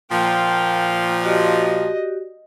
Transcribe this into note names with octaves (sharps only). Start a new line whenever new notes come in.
A#2 F3 F5 G5
F#4 G4 D5 D#5